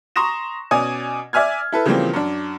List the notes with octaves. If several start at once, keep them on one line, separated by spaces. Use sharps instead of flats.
A#5 C6 C#6 D#6 A#6 E7
B2 C#4 D5 G#5 D#6
D5 E5 G#5 F6 G#6
E4 A4 B4
C#3 E3 F3 G3 A#3 C4
F#2 D4